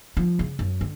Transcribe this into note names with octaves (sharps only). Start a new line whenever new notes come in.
F3
C#3
F#2
D3